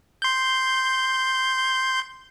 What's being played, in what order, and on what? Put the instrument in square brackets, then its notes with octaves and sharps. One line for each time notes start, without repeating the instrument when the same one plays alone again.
[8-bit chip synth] C6 G6